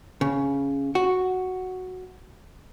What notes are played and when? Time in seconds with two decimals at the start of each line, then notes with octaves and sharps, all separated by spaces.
0.21 C#3
0.95 F#4